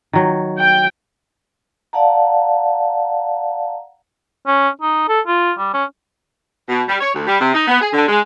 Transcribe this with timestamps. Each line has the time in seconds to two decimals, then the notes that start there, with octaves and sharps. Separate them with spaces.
0.13 D#3 F#3
0.59 G5
1.93 D5 F5 F#5 A5 A#5
4.47 C#4
4.82 D#4
5.09 A4
5.27 F4
5.58 G3
5.73 C#4
6.69 B2
6.89 G3
7.01 C#5
7.14 D2
7.27 G3
7.40 C3
7.54 D#4
7.67 B3
7.81 G#4
7.93 D3
8.08 G#3